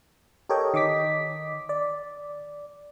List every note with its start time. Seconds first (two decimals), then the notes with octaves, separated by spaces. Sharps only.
0.49 G4 A4 A#4 C#5 D#5 G5
0.74 D#3 D#5 D6 B6
1.69 D5